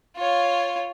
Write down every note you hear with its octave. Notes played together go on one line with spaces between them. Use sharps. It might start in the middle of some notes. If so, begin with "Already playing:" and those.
F4 C#5